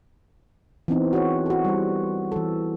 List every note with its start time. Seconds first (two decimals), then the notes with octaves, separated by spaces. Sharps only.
0.88 E3 B3 C4 D#4
1.13 F#4 G#4 C#5
1.46 F#4 A4
1.65 G3 C5
2.32 E3 A4